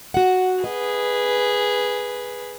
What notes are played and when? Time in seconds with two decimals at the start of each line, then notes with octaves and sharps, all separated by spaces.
0.14 F#4 F#5
0.64 G#4 B4 D#5